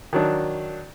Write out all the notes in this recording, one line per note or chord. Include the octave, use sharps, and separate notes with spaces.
D#3 F#3 D4